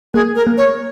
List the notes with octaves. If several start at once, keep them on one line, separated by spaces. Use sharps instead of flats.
A#3 G#4
A#4
A#3
C#5